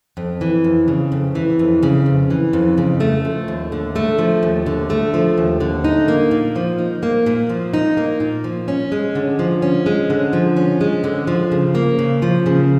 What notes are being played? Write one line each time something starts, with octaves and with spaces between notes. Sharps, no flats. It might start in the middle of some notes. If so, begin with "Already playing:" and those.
F2
E3
F2
C#3
F2
E3
F2
C#3
F2
E3
F2
C#3
A3
F3
D#2
D3
A3
F3
D#2
D3
A3
F3
D#2
D3
D#4
A#3
A#2
F3
D#4
A#3
A#2
F3
D#4
A#3
A#2
F3
C#4
G#3
D3
F3
C#4
G#3
D3
F3
C#4
G#3
D3
F3
C#3
A#3
C#3
F3
C#3